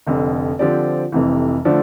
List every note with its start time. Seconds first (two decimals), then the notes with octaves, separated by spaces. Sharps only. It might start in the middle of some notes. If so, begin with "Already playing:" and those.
0.07 F1 F2 D3
0.59 D3 F3 C4 G4 D5
1.12 F1 F2 C3 E3
1.65 D3 F3 A3 D4